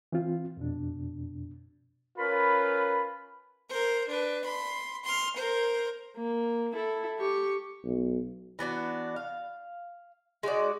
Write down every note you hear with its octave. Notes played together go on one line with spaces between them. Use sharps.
E3 C4 F4
F2 B2 D4
C#4 F4 A#4 B4 B5
A#4 C5
D4 B4
B5 C6
C6 F6
A#4 C5
A#3
E4 A4
G4 C#6
B1
E3 B3 D4 F#4
F5
G#3 D#4 F#4 D5